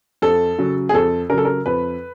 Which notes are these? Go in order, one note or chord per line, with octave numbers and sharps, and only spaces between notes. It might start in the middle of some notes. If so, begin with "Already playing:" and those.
F2 A4
C#3 F#3
G#4
F2 A4
C#3 F#3 A4 A#4
A#4
F2 B4